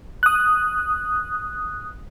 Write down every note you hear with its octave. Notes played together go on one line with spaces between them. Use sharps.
D#6 F#6